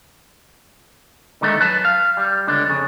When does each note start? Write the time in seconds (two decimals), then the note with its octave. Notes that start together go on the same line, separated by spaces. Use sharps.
1.41 D3 D#3 G#3 A3
1.60 F#2 B4 A5
1.85 F5
2.17 G3
2.47 C#2 D3 D4
2.67 F2 C#3